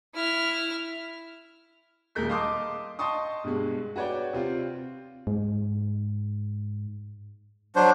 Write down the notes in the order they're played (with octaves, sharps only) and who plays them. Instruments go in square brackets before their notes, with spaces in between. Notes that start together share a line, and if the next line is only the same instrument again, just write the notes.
[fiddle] E4 F6
[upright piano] D#1 A#2 G#3 A#4 G6 B6
D#5 F5 A5 C6 D6 D#6
D#5 G5 A5 C6 C#6 D#6
G2 B2 G#3
F#4 B4 C#5 D5 G5
C3 C4 F4
[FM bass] G#2
[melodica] F#3 D4 C5